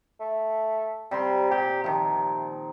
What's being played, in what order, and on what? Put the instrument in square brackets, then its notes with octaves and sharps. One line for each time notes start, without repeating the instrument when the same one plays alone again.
[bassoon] A3
[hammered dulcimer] C3 A#5 C6 [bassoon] G3
[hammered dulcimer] A#2 [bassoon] G4
[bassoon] C3 [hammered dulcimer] D#3 F3